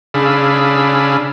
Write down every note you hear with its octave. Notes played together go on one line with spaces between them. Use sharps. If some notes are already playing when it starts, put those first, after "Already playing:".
C#3 D4 G#4 F5 B5 E6